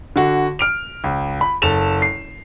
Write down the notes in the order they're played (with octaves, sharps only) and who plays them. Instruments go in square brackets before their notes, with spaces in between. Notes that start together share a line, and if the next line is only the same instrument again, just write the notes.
[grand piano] D3 F#4
F6 D7 F7
C#2
B5
F#1 A4 A5 E7 F7
C7